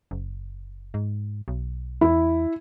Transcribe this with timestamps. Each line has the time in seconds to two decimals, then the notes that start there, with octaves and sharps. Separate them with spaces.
0.11 F#1
0.94 G#2
1.48 B1
2.01 E2 E4